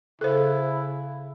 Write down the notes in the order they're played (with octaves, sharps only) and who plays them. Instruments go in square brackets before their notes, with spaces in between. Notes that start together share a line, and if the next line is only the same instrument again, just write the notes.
[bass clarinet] C#3 [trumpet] E4 [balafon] A4 C5